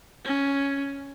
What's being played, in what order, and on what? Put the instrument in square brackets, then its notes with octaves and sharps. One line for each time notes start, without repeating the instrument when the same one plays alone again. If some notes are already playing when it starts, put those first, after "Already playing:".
[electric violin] C#4